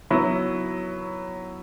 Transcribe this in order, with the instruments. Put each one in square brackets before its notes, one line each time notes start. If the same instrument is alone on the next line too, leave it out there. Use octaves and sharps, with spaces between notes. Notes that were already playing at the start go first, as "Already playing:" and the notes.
[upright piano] F#3 B3 E4